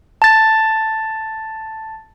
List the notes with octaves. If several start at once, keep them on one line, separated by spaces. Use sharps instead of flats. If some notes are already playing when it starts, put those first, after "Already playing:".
A5 A6